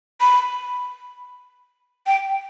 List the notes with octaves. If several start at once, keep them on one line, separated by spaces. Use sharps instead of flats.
B5
G5